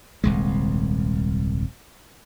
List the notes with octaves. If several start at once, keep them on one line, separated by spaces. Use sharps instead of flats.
D#1 C2 G#3